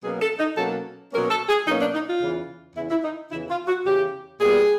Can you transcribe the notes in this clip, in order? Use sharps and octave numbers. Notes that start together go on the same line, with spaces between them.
B2 F#3 A#3 C#4 G#4
A4
D#4
B2 F#3 A#3 C#4 A4
B2 F#3 A#3 C#4 A#4
A4
G#4
B2 F#3 A#3 C#4 D#4
D4
D#4
F4
E2 C#3 E3
E2 C#3 E3 E4
E4
D#4
E2 C#3 E3 E4
F4
F#4
E2 C#3 E3 G4
A#2 G3 B3 G#4